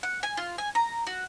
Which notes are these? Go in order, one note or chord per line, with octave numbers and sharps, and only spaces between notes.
F#5
G#5
F4
G#5
A#5
F#4